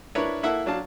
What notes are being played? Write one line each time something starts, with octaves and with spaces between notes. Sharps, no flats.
D4 E4 A#4 B4 C#5
A#3 E4 A4 E5 F#5
F#3 D4 F5 A5